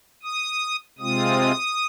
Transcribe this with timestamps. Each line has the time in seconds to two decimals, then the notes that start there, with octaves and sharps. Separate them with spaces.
0.23 D#6
0.99 C3 G#3 C4 F4 D#6